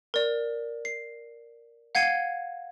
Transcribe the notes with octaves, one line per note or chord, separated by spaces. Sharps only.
A#4 D5
C7
F5 F#5 G#6 C7 D#7